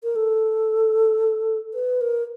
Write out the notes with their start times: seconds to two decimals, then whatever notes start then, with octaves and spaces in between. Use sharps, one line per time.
0.04 A#4
0.16 A4
1.74 B4
2.01 A#4